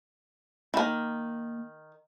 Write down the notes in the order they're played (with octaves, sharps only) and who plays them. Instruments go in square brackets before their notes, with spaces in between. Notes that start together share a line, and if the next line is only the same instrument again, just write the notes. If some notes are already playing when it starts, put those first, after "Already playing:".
[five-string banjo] D#3 E3 [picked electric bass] A#3